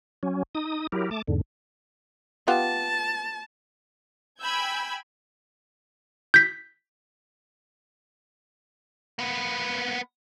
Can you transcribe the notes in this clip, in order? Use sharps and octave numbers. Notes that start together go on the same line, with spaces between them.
F#3 C#4
D#4 D#6
F#3 E4 G4 A#4
A3 A5 D6
E2 G#2 D3
B3 F4 G4 A5
G5 G#5 B5 E6 G6 G#6
G6 B6
A#3 B3